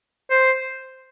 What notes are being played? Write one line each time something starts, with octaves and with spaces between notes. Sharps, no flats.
C5